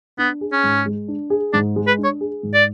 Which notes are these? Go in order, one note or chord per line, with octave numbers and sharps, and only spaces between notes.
B3 D4
G#4
C#4
G#2
G#3
D4
G#4
G#2 D4
G#3
B4
D4
C#5
G#4
G#2
D5